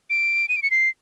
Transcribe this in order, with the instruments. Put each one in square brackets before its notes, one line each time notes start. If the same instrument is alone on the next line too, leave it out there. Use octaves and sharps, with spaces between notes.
[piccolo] D7
D#7
D7
C#7
C7